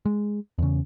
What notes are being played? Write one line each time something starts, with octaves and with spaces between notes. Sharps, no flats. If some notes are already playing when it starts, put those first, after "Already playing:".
G#3
E2 C#3